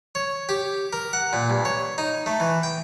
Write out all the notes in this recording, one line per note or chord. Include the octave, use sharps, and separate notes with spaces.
C#5
G4
A#4
F#5
A#2
G2
C#5
D#4
A3
E3
G5